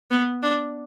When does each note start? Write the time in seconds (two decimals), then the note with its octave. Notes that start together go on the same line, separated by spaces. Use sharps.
0.11 B3
0.42 D4